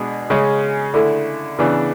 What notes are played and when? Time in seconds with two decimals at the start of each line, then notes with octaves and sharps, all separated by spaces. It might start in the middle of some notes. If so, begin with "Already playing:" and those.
Already playing: B2 G#3 D4
0.30 C#3 G#3 C#4
0.94 D3 A3 E4
1.59 C#3 E3 B3 D4